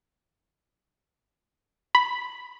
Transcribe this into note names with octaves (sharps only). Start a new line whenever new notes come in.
B5